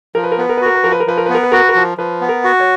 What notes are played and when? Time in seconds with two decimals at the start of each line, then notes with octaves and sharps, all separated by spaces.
0.15 F3 A#4
0.24 B4
0.32 A#4
0.38 B3 B4
0.49 A#4
0.57 B4
0.61 F#4 A#4
0.75 B4
0.84 F3 A#4
0.92 B4
1.00 A#4
1.07 F3 B4
1.17 A#4
1.26 B3 B4
1.35 A#4
1.43 B4
1.52 F#4 A#4
1.60 B4
1.69 A#4
1.75 F3
1.98 F3 B4
2.21 B3
2.29 A#4
2.44 F#4
2.60 C#5